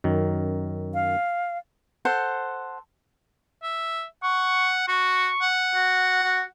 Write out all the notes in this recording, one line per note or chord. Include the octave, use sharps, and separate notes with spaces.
F#2 D#3
F5
A4 C5 F#5
E5
F#5 C#6
F#4 C#6
F#5
F#4
F#4